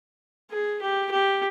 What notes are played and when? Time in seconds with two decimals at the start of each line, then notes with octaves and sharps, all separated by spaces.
0.51 G#4
0.82 G4
1.12 G4